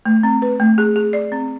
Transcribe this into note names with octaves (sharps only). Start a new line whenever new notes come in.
A3
C4
B4
A3
G#4
G#4
D5
C4